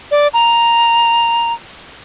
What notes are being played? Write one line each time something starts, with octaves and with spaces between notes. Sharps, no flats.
D5
A#5